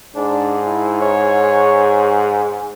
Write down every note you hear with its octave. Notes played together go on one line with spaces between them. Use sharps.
G#2 D4
E4
C#5